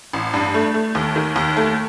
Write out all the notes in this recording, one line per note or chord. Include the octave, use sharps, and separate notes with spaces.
A1
G2
A3
A3
D#2
D#3
D#2
A3